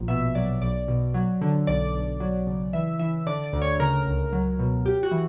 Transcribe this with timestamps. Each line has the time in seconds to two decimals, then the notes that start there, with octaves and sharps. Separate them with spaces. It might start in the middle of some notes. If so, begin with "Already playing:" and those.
Already playing: A#1
0.08 B2 E5
0.35 F#3 D5
0.61 B1 D5
0.88 B2
1.14 F#3
1.41 D3
1.67 B1 D5
1.94 B1
2.20 F#3
2.47 C#3
2.73 E3 E5
2.99 E3 E5
3.27 D3 D5
3.44 D5
3.53 D2
3.62 C#5
3.80 C#3 A#4
4.06 C#2
4.33 F#3
4.59 B2
4.85 F#2 G4
5.03 F#4
5.11 E3